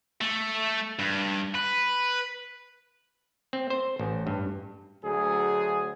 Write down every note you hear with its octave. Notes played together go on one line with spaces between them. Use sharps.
A3
G2
B4
C4
C5
A1
G2
D2 F#3 G#4